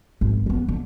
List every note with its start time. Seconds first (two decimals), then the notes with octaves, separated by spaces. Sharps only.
0.21 G#1 E3
0.46 E3 B3
0.68 D3